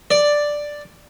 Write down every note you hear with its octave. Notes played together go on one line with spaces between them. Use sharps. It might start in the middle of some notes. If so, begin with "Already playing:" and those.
D5